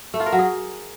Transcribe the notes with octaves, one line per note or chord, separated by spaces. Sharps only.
A3
F4
A#4
F#3
G#4